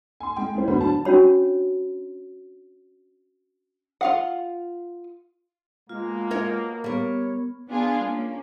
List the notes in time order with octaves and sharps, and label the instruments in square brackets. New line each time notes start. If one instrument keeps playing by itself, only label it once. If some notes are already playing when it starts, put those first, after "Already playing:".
[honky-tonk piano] G#5 C6
G#3 G5
G#3 E4 C5
A2 D3 B3 F#4 C5 B5
F#3 D4 A5
[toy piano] C#4 D4 F#4 C#5 B5
[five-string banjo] F4 F5 F#5
[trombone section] B2 A#3 [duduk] G#3 [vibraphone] F4
[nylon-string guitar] A#4 C#5 D#5
[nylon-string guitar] G3 A#4 [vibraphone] B3 [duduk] C#5
[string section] B3 D4 F4 G#4
A#3 C#4